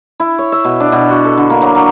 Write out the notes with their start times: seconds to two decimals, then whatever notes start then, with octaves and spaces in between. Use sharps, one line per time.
0.20 E4
0.38 C#5
0.52 E5
0.65 B2
0.80 D4
0.92 B2
1.10 F#4
1.25 A4
1.38 D3
1.50 A#3
1.62 F#3
1.75 F#3